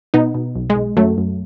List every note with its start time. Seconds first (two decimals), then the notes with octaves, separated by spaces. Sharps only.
0.14 B2 B3 D#4
0.35 B2
0.56 B1
0.70 G#3
0.76 B1
0.96 F#2 F#3 A3
1.18 F#2